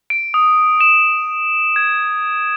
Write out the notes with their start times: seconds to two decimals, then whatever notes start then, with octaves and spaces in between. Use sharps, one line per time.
0.10 D7
0.34 D#6
0.81 E7
1.76 G#6